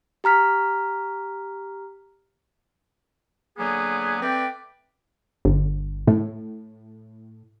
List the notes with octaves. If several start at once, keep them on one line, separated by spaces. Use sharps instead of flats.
G4 A#5 F6 B6
D3 F#3 A#3 B3 G#4
A3 C4 B4 D5 G5
G1
A2